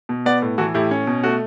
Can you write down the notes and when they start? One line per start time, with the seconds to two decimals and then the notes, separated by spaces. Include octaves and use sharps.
0.09 B2
0.26 B3 D5 F#5
0.42 A2
0.58 E3 F#4 A4
0.74 A2 E4 G4
0.91 C#4
1.07 B2
1.24 A3 F#4